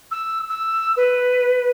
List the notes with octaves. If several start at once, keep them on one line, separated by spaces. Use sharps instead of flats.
E6
E6
B4